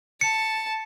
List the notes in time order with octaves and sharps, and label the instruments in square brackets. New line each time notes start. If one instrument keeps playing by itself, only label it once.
[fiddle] A5 [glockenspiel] C#7